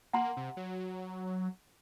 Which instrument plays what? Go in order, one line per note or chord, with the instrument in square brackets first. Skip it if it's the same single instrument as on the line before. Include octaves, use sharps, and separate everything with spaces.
[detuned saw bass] A#3 [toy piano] F#5 A#5 C6
[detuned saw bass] C3
F#3